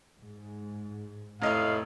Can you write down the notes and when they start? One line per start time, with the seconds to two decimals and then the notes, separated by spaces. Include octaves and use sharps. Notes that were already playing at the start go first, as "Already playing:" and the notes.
0.20 G#2
1.42 F1 A2 D#5 F5